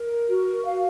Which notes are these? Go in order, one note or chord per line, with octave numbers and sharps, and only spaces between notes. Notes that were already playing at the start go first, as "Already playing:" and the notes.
Already playing: A#4
F#4
F5